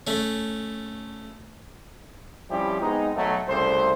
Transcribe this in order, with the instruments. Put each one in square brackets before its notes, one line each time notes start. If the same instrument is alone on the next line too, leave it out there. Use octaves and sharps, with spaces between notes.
[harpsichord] A3 C#4
[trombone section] F3 G3 C4 C#4 E4 G4
G#3 B3 C4 D#4
B1 F#3 A3
C2 C#3 A3 C5